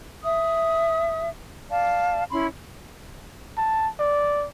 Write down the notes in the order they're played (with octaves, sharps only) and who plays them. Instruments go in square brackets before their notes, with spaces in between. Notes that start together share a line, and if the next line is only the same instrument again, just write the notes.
[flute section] E5 D#6
D5 F5 A5
C#4 E4 B5 C6
[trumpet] A5
D5